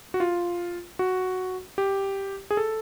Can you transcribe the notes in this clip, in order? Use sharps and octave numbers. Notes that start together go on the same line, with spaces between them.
F#4
F4
F#4
G4
G#4
A4